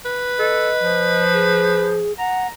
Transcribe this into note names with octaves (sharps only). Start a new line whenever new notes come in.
B4
A4 D#5
F3
G#4
F#5 A#5